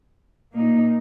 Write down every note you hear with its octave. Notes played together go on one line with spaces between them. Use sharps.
A#2 A#3 D#4